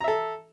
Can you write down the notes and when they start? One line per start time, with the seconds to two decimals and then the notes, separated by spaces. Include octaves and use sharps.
0.01 A#5
0.04 E5
0.08 A4